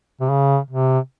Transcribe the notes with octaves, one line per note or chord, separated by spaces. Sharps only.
C3
C#3
C3